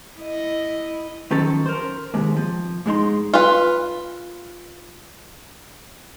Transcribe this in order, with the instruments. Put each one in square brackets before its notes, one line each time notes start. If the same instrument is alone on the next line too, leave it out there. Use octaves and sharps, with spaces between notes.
[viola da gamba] E4 D#5
[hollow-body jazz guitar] D#3 F3 F#3 C#4 A4
A#4 C5
D#2 G#2 C3 G#3
F3
G#2 G#3 D#4 C6
[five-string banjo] F4 B4